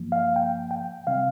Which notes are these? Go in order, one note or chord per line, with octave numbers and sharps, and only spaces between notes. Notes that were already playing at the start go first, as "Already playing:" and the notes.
Already playing: G2 F3 A#3
F5
G5
G5
C3 G3 C4 F5